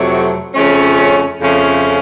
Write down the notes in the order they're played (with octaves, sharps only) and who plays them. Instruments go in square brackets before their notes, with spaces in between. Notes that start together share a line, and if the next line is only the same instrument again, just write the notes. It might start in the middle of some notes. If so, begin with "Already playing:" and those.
Already playing: [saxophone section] F2 C3 F#3 A3
F2 C#3 F3 A3 C#4
F2 C#3 F3 A3 C#4